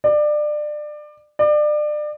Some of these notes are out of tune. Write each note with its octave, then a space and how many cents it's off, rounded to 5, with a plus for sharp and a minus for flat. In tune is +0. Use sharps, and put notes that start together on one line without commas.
D5 +25
D5 +30